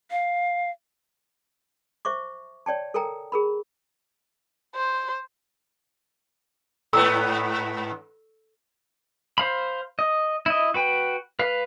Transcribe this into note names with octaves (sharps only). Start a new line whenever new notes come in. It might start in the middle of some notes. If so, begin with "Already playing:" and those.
F5
C5 E5 C#6 D6
C#5 D5 G5 A5
A4 A#4 G5 G#5 A#5
G#4 A#4 B5
C5
G#2 B3 A4 C#6 E6
C5 F5 B5
D#5
E4 D#5
F#4 B4 G5
B4 F5